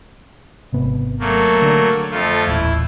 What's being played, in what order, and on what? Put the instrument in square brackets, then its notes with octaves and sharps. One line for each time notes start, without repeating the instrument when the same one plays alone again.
[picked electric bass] G#1 C3 B3
[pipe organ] F#3 A3 A#3
[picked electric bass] D3 C4 D4
[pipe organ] F2 A3 F4
[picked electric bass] D#1 A1 [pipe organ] E4